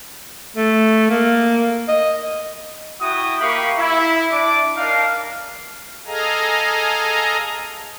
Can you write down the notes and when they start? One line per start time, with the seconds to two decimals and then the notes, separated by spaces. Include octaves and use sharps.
0.56 A3
1.10 A#3
1.88 D#5
3.01 E4 F#4 G5 D#6
3.41 A#3 G4 A#4 F5 B5 C#6
3.79 E4
4.32 D4 D5 D6
4.77 D4 D#4 A#4 F5
6.06 G#4 A4 D#5 F5 G#5 A#5